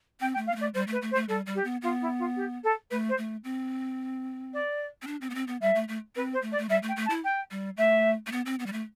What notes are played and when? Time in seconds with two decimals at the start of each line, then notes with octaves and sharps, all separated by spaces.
0.20 C4 G5
0.33 G5
0.37 A3
0.47 F5
0.52 B3
0.56 A3 D5
0.74 G3 C5
0.87 A3
0.92 B4
1.02 A3
1.11 C5
1.15 A3
1.28 G3 A4
1.46 G3
1.55 G4
1.64 B3
1.82 B3 F4
2.01 E4
2.19 F4
2.36 G4
2.63 A4
2.90 A3 B4
3.09 C5
3.18 A3
3.44 C4
4.53 D5
5.02 C4
5.07 D4
5.21 C4
5.30 B3
5.35 C4
5.47 B3
5.61 G3 E5
5.75 A3
5.88 A3
6.16 C4 B4
6.33 C5
6.42 A3
6.51 D5
6.58 A3
6.69 G3 E5
6.83 A3
6.88 G5
6.96 A3
7.06 A5
7.10 E4
7.24 G5
7.51 G3
7.77 A3 E5
8.27 A3
8.32 B3
8.46 C4
8.59 B3
8.66 G3
8.73 A3